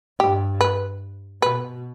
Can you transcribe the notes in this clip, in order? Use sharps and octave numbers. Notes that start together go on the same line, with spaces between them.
G2 G4
B4
B2 B4